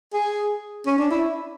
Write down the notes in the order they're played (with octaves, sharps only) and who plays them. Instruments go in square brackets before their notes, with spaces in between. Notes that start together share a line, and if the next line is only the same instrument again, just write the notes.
[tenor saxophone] G#4
C#4
D4
E4